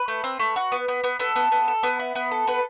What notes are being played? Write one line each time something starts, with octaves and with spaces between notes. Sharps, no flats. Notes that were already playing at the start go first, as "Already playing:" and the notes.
Already playing: B4
A3
C4
A3
F#4
B3
B3
B3
B3 A4
B3
B3
A4
B3
E4
B3
A4
B3 B4